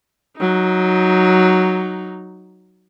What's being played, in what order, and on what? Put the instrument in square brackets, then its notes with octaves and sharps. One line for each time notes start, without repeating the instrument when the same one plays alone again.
[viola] F#3 D#4